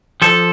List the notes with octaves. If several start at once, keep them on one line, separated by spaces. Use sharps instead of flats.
F3 A4